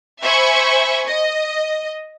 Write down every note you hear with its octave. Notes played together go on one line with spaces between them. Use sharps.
C5 E5 G#5 B5 C#6
D#5